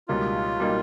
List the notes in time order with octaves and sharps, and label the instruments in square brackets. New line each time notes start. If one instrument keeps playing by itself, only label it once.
[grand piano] C#2 B2 G3 A#3 D#4 [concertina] F4
[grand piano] B2 G3 A#3 D#4